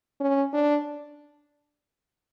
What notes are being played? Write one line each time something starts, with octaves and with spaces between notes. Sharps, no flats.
C#4
D4